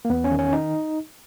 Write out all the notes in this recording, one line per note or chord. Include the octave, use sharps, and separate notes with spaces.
A#3
E2 B3
C#4
D#3
C#4
D#4